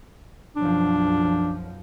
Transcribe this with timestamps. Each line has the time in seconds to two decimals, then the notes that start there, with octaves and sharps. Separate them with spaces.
0.56 B1 F#2 F3 D4